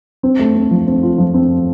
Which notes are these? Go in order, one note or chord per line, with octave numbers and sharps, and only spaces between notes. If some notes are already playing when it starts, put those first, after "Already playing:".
C4
A3
C4
F3
C4
F4
F3
C4